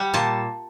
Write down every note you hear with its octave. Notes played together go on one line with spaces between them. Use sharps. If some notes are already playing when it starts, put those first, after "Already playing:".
Already playing: G3 F#5
A#2 A5